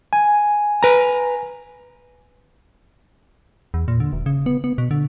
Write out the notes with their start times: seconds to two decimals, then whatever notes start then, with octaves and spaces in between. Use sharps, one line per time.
0.13 G#5
0.83 B4 A#5
3.74 E2
3.88 A#2
4.00 D3
4.13 E1
4.26 C#3
4.46 B3
4.64 B3
4.78 B2
4.91 D3